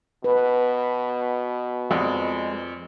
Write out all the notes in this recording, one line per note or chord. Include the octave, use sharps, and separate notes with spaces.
B2 B4
F2 G#3 D5